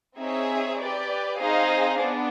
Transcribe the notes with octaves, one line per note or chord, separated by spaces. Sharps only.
C4 D#4 G#4 C#5 E5
G4 B4 D5
C4 D#4 G#4 C5 F5
B3 D4